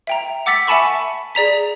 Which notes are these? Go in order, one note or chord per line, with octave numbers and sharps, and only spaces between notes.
E5 G5 A#5
F#5 D6 E6 A6 B6 C#7
E5 F#5 G#5 A5 B5 C#6
G#4 D5 A#5 B6